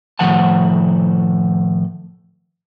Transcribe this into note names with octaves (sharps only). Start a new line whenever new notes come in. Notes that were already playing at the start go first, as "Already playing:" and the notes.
A2 D#3 F3 C5 F#5 A5